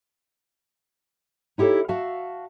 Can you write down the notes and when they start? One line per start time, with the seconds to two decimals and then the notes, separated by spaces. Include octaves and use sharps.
1.58 D#4 E4 G4 A4 C#5
1.88 F#4 E5 F5 A5